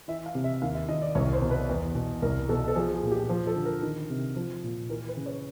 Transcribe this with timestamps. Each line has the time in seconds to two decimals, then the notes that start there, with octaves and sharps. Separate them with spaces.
0.08 E3 E5
0.26 F5
0.35 C3
0.44 E5
0.62 D#2 F5
0.75 E5
0.88 D#3 D#5
1.02 D5
1.15 C2 C#5
1.33 C5
1.42 B2
1.51 B4
1.69 E2
1.95 B2
2.22 C2 A#4
2.49 B2 A4
2.68 A4
2.75 F3 G#4
2.94 G#4
3.03 A#2
3.12 G4
3.29 F3 F4
3.47 A4
3.56 D3
3.65 A#4
3.83 D#3
4.10 C3
4.36 F3
4.63 A#2
4.89 E3 A#4
5.08 B4
5.17 C#3
5.26 C#5